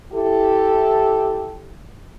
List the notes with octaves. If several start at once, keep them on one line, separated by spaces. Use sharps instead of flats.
E4 G4 A4